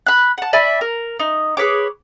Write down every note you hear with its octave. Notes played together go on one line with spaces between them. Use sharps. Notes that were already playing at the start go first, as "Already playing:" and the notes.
B5 F#6
F#5 A5
D5 E5 G#5 B5
A#4
D#4
G#4 B4 C#5 D6